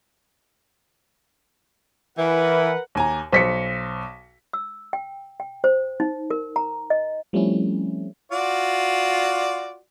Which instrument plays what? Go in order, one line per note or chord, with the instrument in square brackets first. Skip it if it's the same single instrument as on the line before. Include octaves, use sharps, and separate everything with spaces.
[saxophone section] E3 [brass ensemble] A#4 B4 F#5
[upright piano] D#2 G#5 A#5
[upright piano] B1 [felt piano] C5 B6 C#7
[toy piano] E6
G5
G5
C5
D#4
A#4
A#5
D#5
[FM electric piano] F3 G3 A3 C4 C#4 E4
[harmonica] F4 F#4 D5